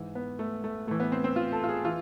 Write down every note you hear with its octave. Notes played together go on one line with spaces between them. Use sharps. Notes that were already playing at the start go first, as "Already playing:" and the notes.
Already playing: G#2 E3
B3
A3
A3
A2 E3 A3
B3
C4
C4
F4
A4
F4
G#4
E3 F4